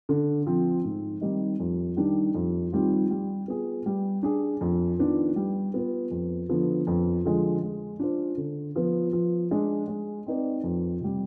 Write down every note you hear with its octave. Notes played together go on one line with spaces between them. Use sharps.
D3
F3 C4
G#2
D#3 G3 C4 D#4
F2
D#3 G3 D4
F2
D#3 G3 C4 F4
G3
B3 F4 G#4
G3
D4 G#4
F2
D#3 B3 D4 F4
G3
B3 F4 B4
F2
D3 F3 B3 D4
F2
D3 F3 G#3
G#3
D4 F4 C5
D3
F3 B3 F4 B4
F3
G#3 D4
G#3
C4 D#4 B4 D5
F2
C3 G3